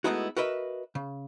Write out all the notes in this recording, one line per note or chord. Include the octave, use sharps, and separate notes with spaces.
G#3 A3 B3 D#4 E4 F#4
F#4 A#4 B4 D#5 E5
C#3